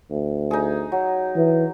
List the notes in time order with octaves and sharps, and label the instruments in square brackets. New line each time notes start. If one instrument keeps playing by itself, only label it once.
[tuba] D2
[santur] D#4 G#4
F#3
[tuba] E3